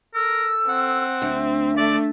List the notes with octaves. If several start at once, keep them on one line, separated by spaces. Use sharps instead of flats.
A4 A#4 E6
C4 F#5
D2 E5
A3 D5